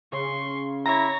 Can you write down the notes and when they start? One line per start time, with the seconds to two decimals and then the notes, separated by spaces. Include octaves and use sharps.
0.12 C#3 C6 C#6
0.86 E4 C#5 A#5 A#6